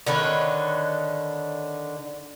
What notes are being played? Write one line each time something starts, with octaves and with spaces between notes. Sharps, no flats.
D3 D#3 B4 C#5